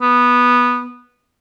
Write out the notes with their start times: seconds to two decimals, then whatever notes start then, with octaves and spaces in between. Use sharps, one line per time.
0.02 B3